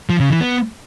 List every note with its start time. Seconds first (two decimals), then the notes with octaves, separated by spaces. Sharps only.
0.10 F3
0.20 C#3
0.30 E3
0.41 B3